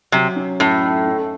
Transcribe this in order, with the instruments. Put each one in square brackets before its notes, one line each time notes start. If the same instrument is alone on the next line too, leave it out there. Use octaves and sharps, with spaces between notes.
[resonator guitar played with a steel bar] C3 [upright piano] F#3
[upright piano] C#4
[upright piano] F#2 [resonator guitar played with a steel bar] A2
[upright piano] D#4
C#4